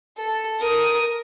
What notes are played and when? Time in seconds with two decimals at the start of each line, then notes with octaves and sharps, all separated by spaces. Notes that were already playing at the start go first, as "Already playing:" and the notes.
0.17 A4
0.59 A#4 D#6